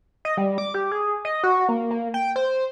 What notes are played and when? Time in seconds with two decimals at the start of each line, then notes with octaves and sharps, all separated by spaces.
0.25 D#5
0.37 G3
0.58 D6
0.74 G4
0.91 G#4
1.25 D#5
1.44 F#4
1.69 A#3
1.91 A#3
2.14 G5
2.36 C5